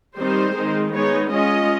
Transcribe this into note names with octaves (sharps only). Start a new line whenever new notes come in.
D#3 G3 C4 D#4 C5
D#3 G#3 C4 D#4
G#3 B3 D#4 C#5
G#3 C#4 F4 D#5